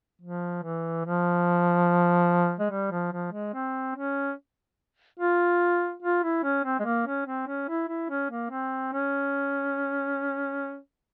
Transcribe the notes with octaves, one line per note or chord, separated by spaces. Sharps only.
F3
E3
F3
G#3
G3
F3
F3
G#3
C4
C#4
F4
F4
E4
C#4
C4
G#3
A#3
C#4
C4
C#4
E4
E4
C#4
A#3
C4
C#4